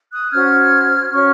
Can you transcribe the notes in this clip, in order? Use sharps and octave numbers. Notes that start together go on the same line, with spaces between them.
D#6 F#6
C#4 F#4 C5 F6 G#6
C#4 F#4 C#5 C#6 F6